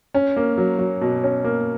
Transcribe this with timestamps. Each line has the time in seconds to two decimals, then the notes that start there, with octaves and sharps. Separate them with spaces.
0.14 C#4
0.37 A#3
0.58 F#3
0.79 F#3
1.01 B2
1.23 C#4
1.44 A#3